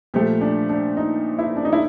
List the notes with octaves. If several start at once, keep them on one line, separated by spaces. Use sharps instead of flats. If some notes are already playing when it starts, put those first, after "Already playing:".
A#2 F3 A3 G4
D4
D4
D#4
E4
D4
D#4
E4